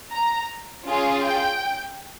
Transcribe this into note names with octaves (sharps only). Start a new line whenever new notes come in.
A#5
C#4 F4 G#4
G5